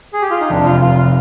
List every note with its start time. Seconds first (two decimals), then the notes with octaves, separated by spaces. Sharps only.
0.13 G#4
0.22 G4
0.31 F4
0.41 D#4
0.49 F1 D4
0.66 F4
0.81 F1 F4